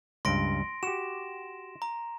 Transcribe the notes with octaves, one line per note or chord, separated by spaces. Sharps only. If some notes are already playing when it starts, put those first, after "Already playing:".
C#2 G2 C6 A#6 D7
F#4 G4 E7
A#5